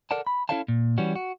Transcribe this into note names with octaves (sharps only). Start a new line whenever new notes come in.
A4 A#4 D5 F#5 A5
B5
C#4 E4 A4 C#5 F5 A5
A#2
E3 G3 C#4 F#4
F#4